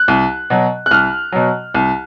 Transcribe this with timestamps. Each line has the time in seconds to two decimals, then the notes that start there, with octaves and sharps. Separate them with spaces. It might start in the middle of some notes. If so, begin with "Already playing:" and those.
Already playing: F#6
0.08 C2
0.50 B2 F#3
0.86 F#6
0.91 C2 F6
1.32 B2 F#3
1.74 C2